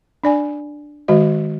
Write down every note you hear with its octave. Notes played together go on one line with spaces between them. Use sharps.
D4 D5 G#5
D#3 G#3 F#4 D#5